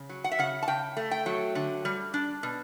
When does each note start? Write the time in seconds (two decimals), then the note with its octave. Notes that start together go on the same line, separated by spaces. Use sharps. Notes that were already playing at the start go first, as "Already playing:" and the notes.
Already playing: C#3
0.09 F#3
0.24 F#5
0.31 E5
0.39 C#3 F#5
0.62 A5
0.68 C#3 G5
0.97 A3
1.11 G5
1.26 F#3
1.55 D3
1.85 G3
2.14 D4
2.43 B2